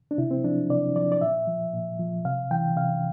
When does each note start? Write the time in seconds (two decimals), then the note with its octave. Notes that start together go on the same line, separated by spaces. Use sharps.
0.11 D4
0.18 C3 E4
0.31 C4
0.44 F3 D4
0.70 C3 D5
0.96 F3 D5
1.12 D5
1.21 A#2 E5
1.47 F3
1.73 A#2
1.99 F3
2.25 C3 F5
2.51 E3 G5
2.77 C3 F5